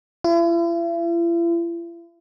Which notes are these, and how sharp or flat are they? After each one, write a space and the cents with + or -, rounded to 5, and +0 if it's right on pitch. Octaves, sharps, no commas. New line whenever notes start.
E4 +45